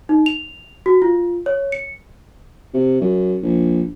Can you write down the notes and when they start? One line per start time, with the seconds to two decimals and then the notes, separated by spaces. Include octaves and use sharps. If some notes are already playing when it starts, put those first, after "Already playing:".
0.09 D#4
0.26 F7
0.86 F#4
1.02 F4
1.46 C#5
1.72 C#7
2.74 C3
3.01 F#2
3.43 A#1